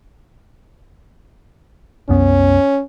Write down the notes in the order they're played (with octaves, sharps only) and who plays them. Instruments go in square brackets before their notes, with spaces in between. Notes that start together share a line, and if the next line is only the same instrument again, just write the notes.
[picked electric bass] C2 F#2 B3 [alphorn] C#4